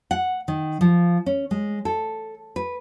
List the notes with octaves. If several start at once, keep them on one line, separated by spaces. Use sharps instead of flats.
F#5
D#3
F3
C#4
G#3
A4
B4